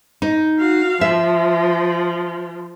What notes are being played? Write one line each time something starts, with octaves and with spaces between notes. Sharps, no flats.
D#4
F#4 F5
F3 E5